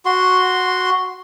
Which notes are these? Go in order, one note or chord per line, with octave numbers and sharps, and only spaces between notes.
F#4 C6